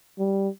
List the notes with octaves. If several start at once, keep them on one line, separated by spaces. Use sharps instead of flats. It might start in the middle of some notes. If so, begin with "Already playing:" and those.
G3